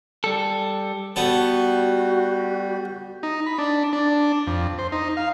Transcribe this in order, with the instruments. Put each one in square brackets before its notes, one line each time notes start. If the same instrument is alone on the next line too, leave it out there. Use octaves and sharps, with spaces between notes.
[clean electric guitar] G3 A4
[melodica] G3 [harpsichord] B3 A4 [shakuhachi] F#4
[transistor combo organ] D#4
B5
D4
D4
F2
C5
D#4
F5